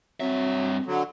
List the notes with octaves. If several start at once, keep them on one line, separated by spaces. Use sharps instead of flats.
G2 F#3 C4 E5
D3 F#3